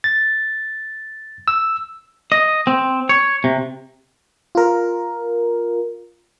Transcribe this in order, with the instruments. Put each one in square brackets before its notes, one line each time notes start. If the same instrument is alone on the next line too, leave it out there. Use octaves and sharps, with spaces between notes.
[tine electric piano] A6
E6
[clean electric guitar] D#5
C4
C#5
C3
[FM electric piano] F4 A#4